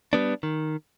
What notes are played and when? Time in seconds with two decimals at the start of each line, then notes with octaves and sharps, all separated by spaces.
0.13 G3 B3 D4
0.43 D#3